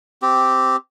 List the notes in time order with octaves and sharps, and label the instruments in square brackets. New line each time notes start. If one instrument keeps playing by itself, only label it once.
[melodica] C4 G4